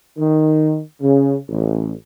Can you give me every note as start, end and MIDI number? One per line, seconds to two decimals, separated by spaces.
0.18 0.80 51
1.02 1.38 49
1.49 1.93 33